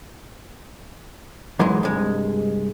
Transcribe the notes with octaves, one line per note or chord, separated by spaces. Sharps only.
G#2 E3 F#3 G#3
C2 G2 G#3